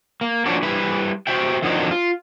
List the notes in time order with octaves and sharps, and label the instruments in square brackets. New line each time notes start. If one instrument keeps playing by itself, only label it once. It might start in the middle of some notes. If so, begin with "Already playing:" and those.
[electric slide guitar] A#3
F3 A#3 C#4 D4 F#4
G3 E4 B4
F#4 C5 E5 G5
F2 D3 D#3 F#3 C4 D#5
F4